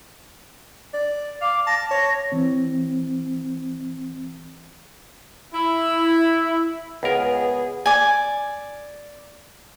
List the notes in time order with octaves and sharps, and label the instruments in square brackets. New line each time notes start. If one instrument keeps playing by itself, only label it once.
[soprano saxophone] D5
[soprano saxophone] F5 [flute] D6
[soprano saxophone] A5 [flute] A#6
[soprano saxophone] C#5
[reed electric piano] E3 C4
[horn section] E4
[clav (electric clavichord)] C#2 A#4 [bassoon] B3 [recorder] G#4
[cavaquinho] D5 G#5